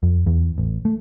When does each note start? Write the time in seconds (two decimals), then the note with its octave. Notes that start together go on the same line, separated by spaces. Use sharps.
0.03 F2
0.26 E2
0.58 A1
0.85 A3